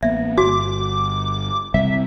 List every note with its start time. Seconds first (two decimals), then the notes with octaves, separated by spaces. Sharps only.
0.03 A1 A#3 B3 E5
0.38 G1 F#4 D6
1.74 C3 G3 C4 E5